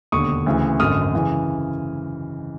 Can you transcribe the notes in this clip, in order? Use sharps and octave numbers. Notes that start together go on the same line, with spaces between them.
E1 D#2 D3 C#6 D#6
D2 C#3 E3
G#1 F#2 D3 D#6 F6
C#3 E3